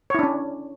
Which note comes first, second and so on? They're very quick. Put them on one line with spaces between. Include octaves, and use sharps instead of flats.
C#5 E4 D4 C#4